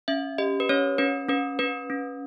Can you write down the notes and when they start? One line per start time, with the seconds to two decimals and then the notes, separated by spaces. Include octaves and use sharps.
0.08 C#4 E5
0.38 G4 D#5
0.60 B4
0.69 C#4 C#5
0.98 C#4 B4
1.29 C#4 B4
1.59 C#4 B4
1.90 C#4